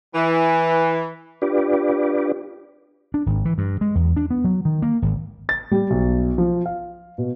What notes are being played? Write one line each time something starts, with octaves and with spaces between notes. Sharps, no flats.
E3
D4 F4 G4 B4 D5
D4
G#1
E3
G2
G#3
E2
D4
B3
F#3
D#3
A#3
G#1
A6
G3
B1
F3
F5
B2